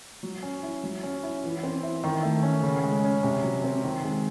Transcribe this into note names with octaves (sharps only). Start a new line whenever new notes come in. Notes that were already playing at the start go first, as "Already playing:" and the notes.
F#3
C#4
E4
F#3
C#4
E4
E3
C4
E4
D#3
A3
C#4
C#3
G#3
C#4
C3
F#3
C4
D#3
G#3